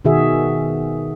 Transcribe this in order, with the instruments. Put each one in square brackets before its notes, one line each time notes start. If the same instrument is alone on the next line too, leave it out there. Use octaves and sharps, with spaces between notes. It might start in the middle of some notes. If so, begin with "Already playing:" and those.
[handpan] B2 D#3 F#4 G#4 E5